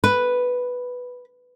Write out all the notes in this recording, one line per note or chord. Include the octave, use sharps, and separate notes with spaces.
B4